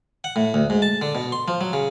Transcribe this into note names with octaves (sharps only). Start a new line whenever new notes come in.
F#5
A2
D2
G#2
A5
D3
B2
C6
F3
F#3
C#3